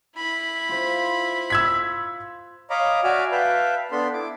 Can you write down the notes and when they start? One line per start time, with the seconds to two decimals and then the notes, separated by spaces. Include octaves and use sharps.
0.16 E4 B5
0.69 F4 C5
1.50 E6 G#6 B6
2.70 C#5 D#5 F5 A#5 B5 D6
3.04 F#4 D5 E5 G#5 D6 F6
3.32 B4 E5 F5 G5 A5 B5
3.92 B3 D4 A4 B5 C6
4.13 E4 D6